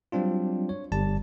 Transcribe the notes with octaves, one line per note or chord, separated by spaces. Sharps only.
F#3 G3 C4 D4 F4
C#5
G1 G3 A5